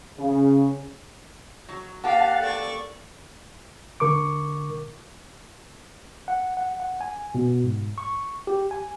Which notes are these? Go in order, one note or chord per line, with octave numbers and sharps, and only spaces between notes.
C#3
F#3
A#3 G4 F5 F#5 A5
A4 D5 C#6
D3 A#4 C#6 D6
F#5
F#5
F#5
G#5
B2
G#2
C#6
G4
G#5